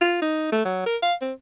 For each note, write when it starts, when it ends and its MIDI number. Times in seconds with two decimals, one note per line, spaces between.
0.01 0.17 65
0.22 0.51 63
0.52 0.64 57
0.65 0.82 54
0.86 0.97 70
1.02 1.14 77
1.22 1.33 60